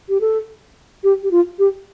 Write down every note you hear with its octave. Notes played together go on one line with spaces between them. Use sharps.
G4
A4
G4
G4
F4
G4